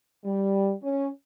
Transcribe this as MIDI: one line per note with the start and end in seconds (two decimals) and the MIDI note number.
0.25 0.72 55
0.83 1.08 61